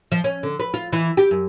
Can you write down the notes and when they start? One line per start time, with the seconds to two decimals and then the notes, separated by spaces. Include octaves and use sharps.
0.12 F3
0.24 C#4
0.43 D3
0.59 B4
0.74 F4
0.93 E3
1.17 G4
1.31 F#2